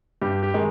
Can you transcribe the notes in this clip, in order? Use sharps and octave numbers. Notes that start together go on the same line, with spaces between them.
G2 G4
G4
D#3 G#3